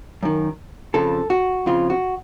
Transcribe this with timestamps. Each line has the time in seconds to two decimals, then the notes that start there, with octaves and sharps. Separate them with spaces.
0.23 F#2 D#3
0.94 F2 C#3 F3 A4
1.30 F#4
1.66 F2 C#3 F3 F4
1.90 F#4